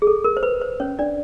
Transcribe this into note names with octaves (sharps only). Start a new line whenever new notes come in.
G#4
A4
A#4
C5
B4
C5
C#4 C#5
D4 D5